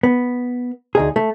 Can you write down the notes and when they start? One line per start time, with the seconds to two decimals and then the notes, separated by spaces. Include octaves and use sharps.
0.03 B3
0.95 D2 D#4 G#4
1.16 A3